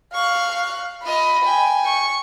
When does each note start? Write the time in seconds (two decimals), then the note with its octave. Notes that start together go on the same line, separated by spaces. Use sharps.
0.14 F5 C#6 F#6
1.05 F4 D#5 B5
1.45 G5 G#5
1.85 C#6